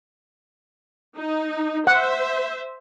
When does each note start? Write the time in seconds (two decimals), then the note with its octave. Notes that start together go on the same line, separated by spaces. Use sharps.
1.17 D#4
1.87 C5 E5 F#5